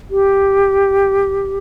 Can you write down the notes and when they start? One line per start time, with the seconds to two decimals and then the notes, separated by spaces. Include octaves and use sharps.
0.10 G4